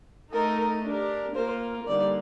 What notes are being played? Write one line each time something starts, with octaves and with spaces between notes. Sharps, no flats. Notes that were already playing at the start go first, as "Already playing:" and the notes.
A3 D#4 A4 A#4 D#5
D4 G4 A#4
A#3 F4 A#4 C5
D3 G3 A#3 D#4 D5